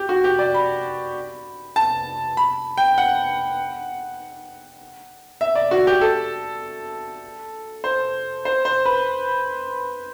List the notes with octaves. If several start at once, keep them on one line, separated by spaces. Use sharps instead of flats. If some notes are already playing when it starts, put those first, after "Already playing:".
Already playing: G4
F#4
G4
D5
B5
A5
B5
G5
F#5
E5
D5
F#4
G4
A4
C5
C5
C5
B4